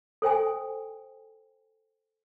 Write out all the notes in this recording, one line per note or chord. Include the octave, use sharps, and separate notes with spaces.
A4 C5 G5 G#5